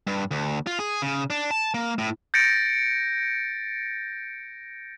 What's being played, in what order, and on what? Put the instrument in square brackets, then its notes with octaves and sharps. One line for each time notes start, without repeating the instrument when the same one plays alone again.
[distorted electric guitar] G2
D2
F4
G#4
C#3
D4
A5
A#3
A2
[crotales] G6 A6 A#6 C#7 D7